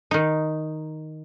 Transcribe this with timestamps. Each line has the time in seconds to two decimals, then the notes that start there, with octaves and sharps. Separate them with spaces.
0.11 D#3 D#4